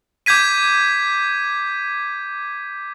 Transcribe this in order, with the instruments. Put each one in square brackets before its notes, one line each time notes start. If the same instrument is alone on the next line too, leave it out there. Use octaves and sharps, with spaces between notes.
[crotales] D6 G6 G#6 B6 D#7